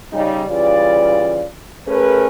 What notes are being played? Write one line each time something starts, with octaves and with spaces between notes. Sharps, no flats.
C#3 G3 D#4
C#3 E3 G3 F4 D5
A3 C#4 G#4 A#4 B4